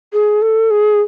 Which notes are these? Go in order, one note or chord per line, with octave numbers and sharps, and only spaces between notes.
G#4
A4
G#4